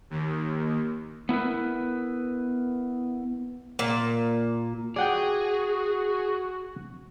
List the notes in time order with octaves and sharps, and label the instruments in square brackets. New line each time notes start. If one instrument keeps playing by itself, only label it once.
[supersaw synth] D#2
[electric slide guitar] B3 E4 A#4 B4
[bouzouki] A#2
[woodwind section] F#4 [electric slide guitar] G#4 [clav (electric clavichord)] D5 F#5 G5